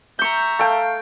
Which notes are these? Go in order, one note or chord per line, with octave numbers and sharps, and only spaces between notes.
E5 A#5 C#6 G6
A3 F5 G5